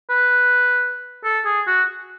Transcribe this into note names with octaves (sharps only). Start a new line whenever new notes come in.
B4
A4
G#4
F#4